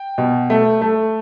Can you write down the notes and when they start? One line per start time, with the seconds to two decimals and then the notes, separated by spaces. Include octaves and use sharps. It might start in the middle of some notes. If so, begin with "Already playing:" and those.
Already playing: G5
0.18 B2
0.50 A3
0.82 A3